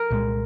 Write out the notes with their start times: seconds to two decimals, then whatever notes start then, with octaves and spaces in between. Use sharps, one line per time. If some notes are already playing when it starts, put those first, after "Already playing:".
Already playing: A#4
0.10 C2 A#2 F3 G#3